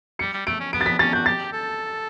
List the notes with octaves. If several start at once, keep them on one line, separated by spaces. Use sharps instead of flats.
G3 C#7
G3
A3 D7
C#4
B3 D7
A6
B6
C#4 A6
F#4 G6
G4 A6
A4